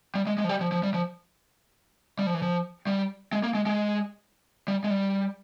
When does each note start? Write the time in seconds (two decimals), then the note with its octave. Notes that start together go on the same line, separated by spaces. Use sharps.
0.15 G3
0.27 G#3
0.38 G#3
0.44 F3
0.49 G3
0.61 F3
0.72 F3
0.83 G3
0.94 F3
2.19 G3
2.27 F3
2.34 E3
2.42 F3
2.87 G3
3.33 G#3
3.43 A#3
3.55 G#3
3.66 G#3
4.68 G3
4.84 G#3
4.90 G3